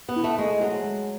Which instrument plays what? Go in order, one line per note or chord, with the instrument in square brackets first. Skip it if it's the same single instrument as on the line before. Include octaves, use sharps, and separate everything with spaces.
[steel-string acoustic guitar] B3
[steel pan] E4
[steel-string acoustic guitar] A3
[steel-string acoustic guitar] G#3 [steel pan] A3
[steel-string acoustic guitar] F#3 [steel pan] G#4
[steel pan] G#3